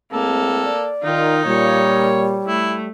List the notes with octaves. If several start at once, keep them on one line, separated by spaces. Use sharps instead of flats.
A2 G#3 A#3 C4 A4
D5
D#3 D#4 F4
A#2 G3 C#5
A3 E4